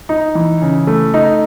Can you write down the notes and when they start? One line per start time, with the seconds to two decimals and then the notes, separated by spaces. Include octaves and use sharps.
0.09 D#4
0.35 E3
0.61 C#3
0.87 A3
1.14 D#4